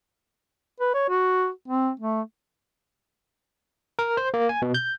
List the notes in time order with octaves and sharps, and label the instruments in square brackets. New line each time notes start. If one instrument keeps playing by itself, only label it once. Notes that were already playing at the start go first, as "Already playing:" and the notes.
[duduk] B4
C#5
F#4
C4
A3
[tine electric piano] A#4
C5
A#3
G#5
B2
G6